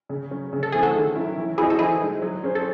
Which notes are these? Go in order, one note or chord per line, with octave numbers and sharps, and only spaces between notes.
C#3
F#3 C#4
C#3
A4
E3 A3 C4 G#4
F#4 A4
D#3
F#3 C#4 E4
E3
C4 E4 F#4 G#4 C5 D#5
A4
E3 E4 G#4
G#3 D#4
F#3
C#4 G#4 C5
A4